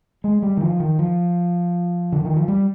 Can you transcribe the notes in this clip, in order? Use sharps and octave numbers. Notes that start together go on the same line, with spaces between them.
G#3
G3
D#3
F3
D#3
F3
D3
D#3
F3
G3